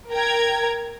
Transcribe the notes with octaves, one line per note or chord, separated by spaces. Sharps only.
A#4 G5 A#5 G#6